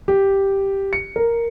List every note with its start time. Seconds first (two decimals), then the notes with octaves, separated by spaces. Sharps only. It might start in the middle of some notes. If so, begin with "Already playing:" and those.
0.08 G4
0.93 C#7
1.16 A#4